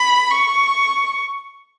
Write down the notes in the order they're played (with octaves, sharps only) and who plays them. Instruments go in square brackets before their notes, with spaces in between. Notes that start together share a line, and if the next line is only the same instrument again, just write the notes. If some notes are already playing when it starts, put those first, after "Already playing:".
Already playing: [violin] B5
C#6